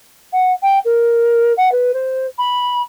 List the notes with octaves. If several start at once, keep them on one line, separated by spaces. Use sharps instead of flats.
F#5
G5
A#4
F#5
B4
C5
B5